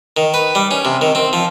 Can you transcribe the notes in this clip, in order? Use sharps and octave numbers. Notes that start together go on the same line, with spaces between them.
D#3
B4
G3
C#4
C3
D#3
C4
F3